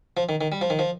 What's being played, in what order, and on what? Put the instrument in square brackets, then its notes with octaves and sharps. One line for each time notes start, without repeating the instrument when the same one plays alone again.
[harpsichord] F3
D#3
D#3
G3
F3
D#3
F3